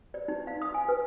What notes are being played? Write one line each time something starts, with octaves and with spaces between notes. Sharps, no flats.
D5
D#4
F5
D#6
G#5
B4